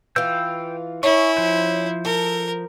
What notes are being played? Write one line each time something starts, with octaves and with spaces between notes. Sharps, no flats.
E3 F4 G5 E6 G6
C#4 E4 C#6
F3 C5
A4 A#4